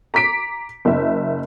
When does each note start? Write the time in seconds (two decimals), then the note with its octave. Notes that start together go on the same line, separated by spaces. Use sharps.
0.14 A#5 D6 B6 D7
0.85 F#1 E5